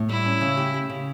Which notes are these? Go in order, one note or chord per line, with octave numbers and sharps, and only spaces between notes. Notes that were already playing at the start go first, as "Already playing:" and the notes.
Already playing: A2
G3 E4
C#4
C#3
G4
G4
C#3